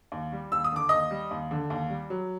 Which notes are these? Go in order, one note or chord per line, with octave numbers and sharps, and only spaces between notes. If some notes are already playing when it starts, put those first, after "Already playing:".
D#2
G3
D#2 E6
D#6
D3 D6
D#2 D#5 D#6
G3
D#2
D3
D#2
G3
F#3